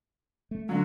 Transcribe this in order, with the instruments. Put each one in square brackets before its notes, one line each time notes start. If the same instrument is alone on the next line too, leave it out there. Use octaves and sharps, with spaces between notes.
[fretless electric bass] A3
[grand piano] D3 F#3 [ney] F#4